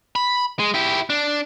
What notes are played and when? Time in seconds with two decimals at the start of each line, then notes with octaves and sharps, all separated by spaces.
0.16 B5
0.59 G#3
0.74 E4 G4
1.10 D4